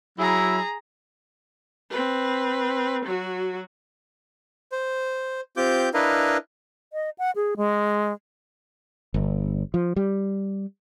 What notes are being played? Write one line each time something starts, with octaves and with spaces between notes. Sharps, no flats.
F#3 E4 G#4 A#5
C4 B4
F#3 F#4
C5
C4 F4 G4 D6 G6
D4 E4 A#4 B4 D#5 F5
D#5
F#5
G#4
G#3
G1
F3
G3